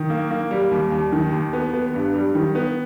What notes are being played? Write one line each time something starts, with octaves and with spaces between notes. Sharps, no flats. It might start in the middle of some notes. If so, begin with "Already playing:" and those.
Already playing: D#3
A#3
A#3
G3
D#2
D#2
D#3
D#2
B3
B3
G2
G3
D#3
B3